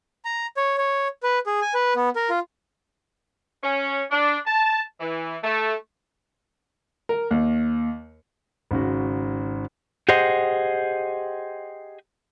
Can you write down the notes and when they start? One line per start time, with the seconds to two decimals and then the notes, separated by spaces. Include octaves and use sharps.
0.25 A#5
0.57 C#5
0.78 C#5
1.23 B4
1.46 G#4
1.61 G#5
1.74 B4
1.96 B3
2.16 A#4
2.30 F4
3.63 C#4
4.11 D4
4.46 A5
5.00 E3
5.43 A3
7.09 A#4
7.31 D#2
8.71 G#1 C#3 F#4
10.09 G4 G#4 C5 D#5 F#5